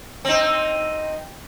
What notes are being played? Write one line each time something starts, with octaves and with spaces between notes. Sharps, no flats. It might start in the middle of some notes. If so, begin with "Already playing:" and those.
C4 D#4